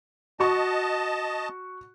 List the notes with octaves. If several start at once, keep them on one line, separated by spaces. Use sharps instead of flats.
F#4 D#5 A5 C#6